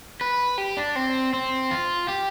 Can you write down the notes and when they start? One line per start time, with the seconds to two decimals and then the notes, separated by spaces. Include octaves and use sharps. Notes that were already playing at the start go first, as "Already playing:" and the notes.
0.21 B4
0.58 G4
0.77 D4
0.96 C4
1.33 C4
1.71 F4
2.08 G4